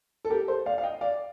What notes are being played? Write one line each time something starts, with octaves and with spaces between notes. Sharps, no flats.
A4
G4 A#4
A4 C5
D5 F5
F5
D#5 G5
D5 F5